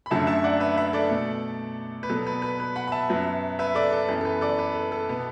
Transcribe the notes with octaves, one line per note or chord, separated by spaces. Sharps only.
B5
F#2 D3 F#3 A3 E5 A5
E5 A5
D5 F#5
B4 E5
B4 E5
E5
A4 D5
B2 A3
B4
B2 F#3 B3 A4
B4
B4
B4
F#5 B5
B5
E5 A5
F#2 F#3 B3
B4 E5
A4 D5
A4
F#2 E3 B3 A4
A4
B4
A4 D5
B4
A4
A4
B2 B3